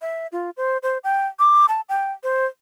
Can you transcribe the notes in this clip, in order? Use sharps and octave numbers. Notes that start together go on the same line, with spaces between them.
E5
F4
C5
C5
G5
D6
A5
G5
C5